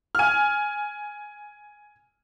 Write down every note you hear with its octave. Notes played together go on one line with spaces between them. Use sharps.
G#5 F6